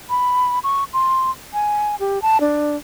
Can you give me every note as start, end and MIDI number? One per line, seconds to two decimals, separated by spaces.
0.10 0.59 83
0.64 0.84 85
0.93 1.31 84
1.53 1.95 80
2.00 2.21 67
2.22 2.41 81
2.41 2.76 62